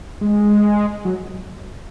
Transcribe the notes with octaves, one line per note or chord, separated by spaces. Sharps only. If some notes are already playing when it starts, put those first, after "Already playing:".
G#3
F#3